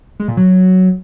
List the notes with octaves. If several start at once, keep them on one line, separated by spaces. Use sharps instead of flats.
G#3
A#2
F#3